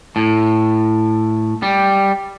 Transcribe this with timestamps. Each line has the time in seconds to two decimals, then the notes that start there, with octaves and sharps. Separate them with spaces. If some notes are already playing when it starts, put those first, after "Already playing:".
0.16 A2
1.63 G3